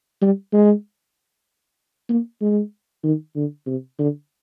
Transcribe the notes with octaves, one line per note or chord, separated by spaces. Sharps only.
G3
G#3
A#3
G#3
D#3
D3
C3
D3